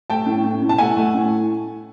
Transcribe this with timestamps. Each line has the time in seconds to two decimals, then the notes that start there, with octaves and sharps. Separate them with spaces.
0.10 A3 G5 A5
0.26 A2
0.44 A2
0.62 A2
0.69 A5
0.78 A3 F#5 G#5
0.97 A3
1.14 A2